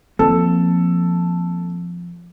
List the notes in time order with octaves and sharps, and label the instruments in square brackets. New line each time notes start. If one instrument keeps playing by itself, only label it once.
[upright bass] F3 [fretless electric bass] A#3 C4 [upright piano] A4